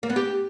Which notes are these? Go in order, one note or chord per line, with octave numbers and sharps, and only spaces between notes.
A#3
B3
G4